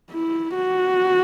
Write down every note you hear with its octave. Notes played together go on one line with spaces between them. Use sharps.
E4
F#4